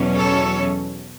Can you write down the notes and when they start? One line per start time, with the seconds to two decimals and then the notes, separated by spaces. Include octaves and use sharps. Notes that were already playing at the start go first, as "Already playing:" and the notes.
Already playing: E2 B2 F#3 C#4
0.15 A4 C#5